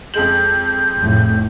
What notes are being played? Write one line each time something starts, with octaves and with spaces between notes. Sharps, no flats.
F2 G#3 G6 F#7
F1 A2